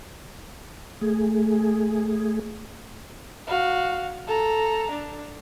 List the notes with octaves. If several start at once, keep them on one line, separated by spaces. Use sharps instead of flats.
A3 G#4
F#4 F5
A4 A#5
D4